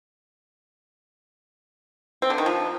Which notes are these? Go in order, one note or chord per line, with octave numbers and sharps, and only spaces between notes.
C4
D3
D#3
F3